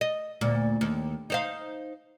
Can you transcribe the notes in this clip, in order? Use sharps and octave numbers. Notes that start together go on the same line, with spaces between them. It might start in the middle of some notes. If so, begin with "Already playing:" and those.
D#5
D2 A#2
D#2
D#4 C5 F5